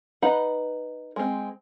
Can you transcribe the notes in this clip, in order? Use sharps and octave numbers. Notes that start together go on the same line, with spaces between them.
D#4 B4 D#5 F#5 B5
G#3 C4